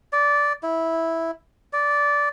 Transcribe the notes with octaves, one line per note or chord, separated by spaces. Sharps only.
D5
E4
D5